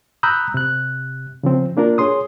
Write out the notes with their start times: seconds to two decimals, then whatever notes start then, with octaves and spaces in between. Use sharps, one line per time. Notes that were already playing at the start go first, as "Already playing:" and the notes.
0.23 A#5 B5 D#6 E6 F#6 G6
0.54 C3 F#6
1.43 C#3 F3 C4
1.77 A#3 D4 F4 A#4
1.98 G#4 C#5 C6 D#6